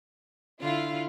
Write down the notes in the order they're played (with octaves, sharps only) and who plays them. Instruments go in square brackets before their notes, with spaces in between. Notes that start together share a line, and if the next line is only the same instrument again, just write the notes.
[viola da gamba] D3 E4 [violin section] F4